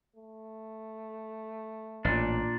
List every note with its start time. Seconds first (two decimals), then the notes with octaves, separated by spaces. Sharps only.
0.16 A3
2.05 A1 A#2 D4